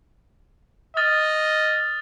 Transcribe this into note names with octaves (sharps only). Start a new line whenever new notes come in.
D#5 D#6 F6 A6